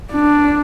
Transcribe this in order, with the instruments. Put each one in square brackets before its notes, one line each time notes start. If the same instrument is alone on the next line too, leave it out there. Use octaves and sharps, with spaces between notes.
[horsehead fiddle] D4